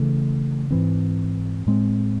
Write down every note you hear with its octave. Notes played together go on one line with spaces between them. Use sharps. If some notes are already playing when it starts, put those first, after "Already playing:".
Already playing: C#3 E3 A3
G#2 E3 C4
A2 G#3 C4